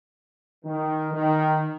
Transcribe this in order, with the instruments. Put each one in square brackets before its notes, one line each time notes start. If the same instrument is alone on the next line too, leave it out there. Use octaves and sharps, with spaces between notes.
[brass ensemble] D#3
D#3